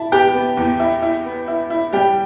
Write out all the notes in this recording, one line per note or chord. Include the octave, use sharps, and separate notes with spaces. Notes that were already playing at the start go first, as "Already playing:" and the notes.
Already playing: E4 A5
B3 G4 G5
B3
E2
E4
E4
B3
E4
E4
G3 G4 G5